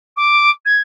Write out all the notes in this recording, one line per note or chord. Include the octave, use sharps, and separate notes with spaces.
D6
G#6